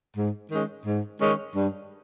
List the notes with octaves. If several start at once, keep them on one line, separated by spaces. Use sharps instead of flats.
G#2
D#3 G#3 C#4
G#2
D#3 G#3 C#4
G2